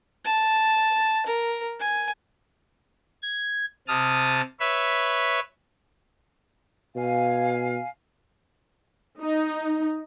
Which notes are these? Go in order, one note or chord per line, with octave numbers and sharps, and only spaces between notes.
A5
A#4
G#5
G#6
C3 A5 D#6 F6
B4 C#5 E5
B2 F5 G#5
D#4